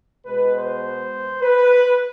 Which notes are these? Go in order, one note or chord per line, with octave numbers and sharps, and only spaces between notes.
B2 G#3 B4
C5
B4